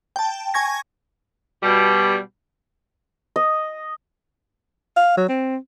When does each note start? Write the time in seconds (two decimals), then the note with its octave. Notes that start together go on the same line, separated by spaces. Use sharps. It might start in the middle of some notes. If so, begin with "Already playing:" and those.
0.16 G5 A5
0.54 G#5 C#6 G#6 A#6
1.63 B2 G3
3.36 D#5
4.97 F5
5.17 F#3
5.29 C4